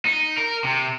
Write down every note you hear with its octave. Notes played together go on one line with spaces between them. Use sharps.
D#4
A#4
C3